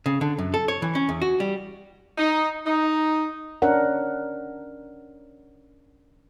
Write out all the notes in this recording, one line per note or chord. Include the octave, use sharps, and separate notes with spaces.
C#3
D3
F#2
A4
C#5
E3
C#4
E2
F#4
G3
D#4
D#4
C#4 D4 A#4 F#5